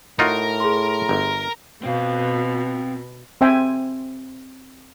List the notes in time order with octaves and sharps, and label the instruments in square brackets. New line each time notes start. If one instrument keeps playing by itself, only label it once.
[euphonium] A2 [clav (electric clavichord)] D#4 F4 F#4 [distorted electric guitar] A#4
[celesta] G#4 C6
[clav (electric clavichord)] G1
[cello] B2 [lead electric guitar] C4 F5
[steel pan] C4 C5 E5 G5 G#5